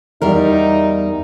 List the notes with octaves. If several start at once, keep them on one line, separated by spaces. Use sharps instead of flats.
E2 G3 D#4 A#4